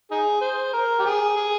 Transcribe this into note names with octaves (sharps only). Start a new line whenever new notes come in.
D#4 G#4
C5
A#4
G4
G#4
G#4